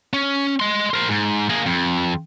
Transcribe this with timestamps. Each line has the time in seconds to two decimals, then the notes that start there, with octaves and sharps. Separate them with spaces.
0.13 C#4
0.60 D#5 C6
0.94 A#4 C5
1.08 G#2
1.49 A#3 G#4
1.66 F2